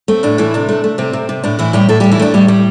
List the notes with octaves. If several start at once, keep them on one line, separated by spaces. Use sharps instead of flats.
A3 C4
A2 D4
E3 A3 E4
C3 D4
A3
A3
C3 C4
C3
C3
A2 D4
A2 E3 E4
A2 G3 G4
A2 A3 A4
A2 G3 G4
E3 E4
A3 D4
A2 G3 G4
G3